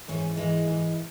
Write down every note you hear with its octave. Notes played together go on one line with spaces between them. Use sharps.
G#2 E3 C#4
G#2 E3 G#3
G#2 E3